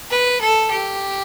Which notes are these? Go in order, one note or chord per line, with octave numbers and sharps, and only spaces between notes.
B4
A4
G4